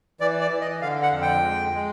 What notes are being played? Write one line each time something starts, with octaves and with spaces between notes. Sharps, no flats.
E3 D5
D5
E3
D#5
D3 F5
F#5
F2
G5
G#3
G#3